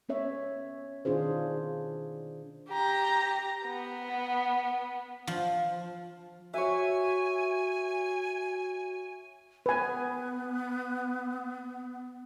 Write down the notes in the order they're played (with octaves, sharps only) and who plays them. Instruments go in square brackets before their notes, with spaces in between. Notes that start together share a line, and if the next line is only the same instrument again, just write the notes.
[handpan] B3 C#4 C#5 E5
B2 D#3 D4 F4 G#4 C5
[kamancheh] G4 A#5
B3
[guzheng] F3
[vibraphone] F#4 [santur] C#5 E5 [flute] G#5
[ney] B3 [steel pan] B4 G#5